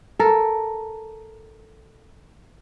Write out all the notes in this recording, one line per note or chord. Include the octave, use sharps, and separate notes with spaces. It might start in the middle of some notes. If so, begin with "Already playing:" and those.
A4 A#4